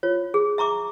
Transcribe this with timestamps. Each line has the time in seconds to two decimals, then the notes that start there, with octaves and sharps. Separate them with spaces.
0.03 F4 C#5
0.34 G#4
0.58 E5 A#5 C#6 D6